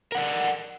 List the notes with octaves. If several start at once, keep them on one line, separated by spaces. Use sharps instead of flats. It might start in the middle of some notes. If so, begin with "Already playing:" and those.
A#4 D5 F#5